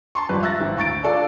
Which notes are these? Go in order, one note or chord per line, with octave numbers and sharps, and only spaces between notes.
A5 C6 C#6
G#1 F2 G3 B4
E5 E6 F#6 A6 A#6
G#1 E3
D2 C#6 A6 D7
D4 F4 A4 D5